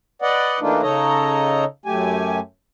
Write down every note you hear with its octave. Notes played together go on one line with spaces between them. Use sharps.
B4 D5 D#5 F#5
E3 A3 A#3 D4 D#4 F4
C#3 D#4 A4 C#5 D#5 A#5
F#2 A3 G4 G#5